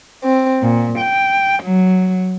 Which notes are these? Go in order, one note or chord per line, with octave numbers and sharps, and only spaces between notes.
C4
A#2
G5
F#3